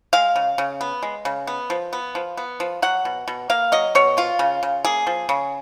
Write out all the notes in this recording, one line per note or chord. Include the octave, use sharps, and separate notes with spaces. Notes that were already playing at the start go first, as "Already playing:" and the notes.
G#3 F5
C#3
C#3
B3
G#3
C#3
B3
F3
B3
F3
B3
F3
F#3 F#5
B2
B2
A#3 F5
F#3 D#5
B2 C#5
F3 F4
C#3
C#3
A#3 G#4
F3
C#3